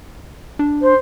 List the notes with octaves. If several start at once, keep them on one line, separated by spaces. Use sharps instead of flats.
D4
C5